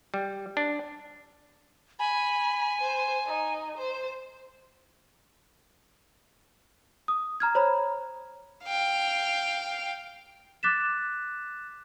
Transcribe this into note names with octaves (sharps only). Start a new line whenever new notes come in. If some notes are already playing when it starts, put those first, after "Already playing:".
G3
D4
G#5 B5
C5
D#4
C5
D#6
A#5 F6 G#6
C5 C#5 A#5 B5
F5 G5
D6 F#6 A6 B6 E7